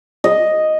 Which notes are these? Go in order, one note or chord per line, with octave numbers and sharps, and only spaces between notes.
D#5